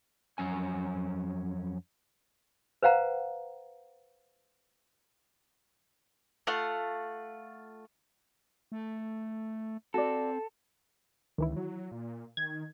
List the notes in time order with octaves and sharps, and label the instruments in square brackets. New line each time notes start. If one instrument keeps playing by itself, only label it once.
[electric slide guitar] F2 A#2 F#3 C#4 G#5
[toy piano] B4 C5 F5 F#5 A#5
[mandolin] A3 F4 F5 F#5
[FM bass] A3
[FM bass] C4 [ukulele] F#4 D5 [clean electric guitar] A4
[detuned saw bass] C#2 [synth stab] D#3 E3 E4
[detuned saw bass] F#3
A#2
[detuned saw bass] D#3 [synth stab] G#6